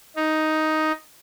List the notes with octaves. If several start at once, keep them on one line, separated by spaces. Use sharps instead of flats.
D#4